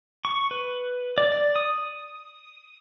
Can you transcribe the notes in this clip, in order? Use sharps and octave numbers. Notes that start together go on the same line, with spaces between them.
C#6
B4
D5
D5
D#6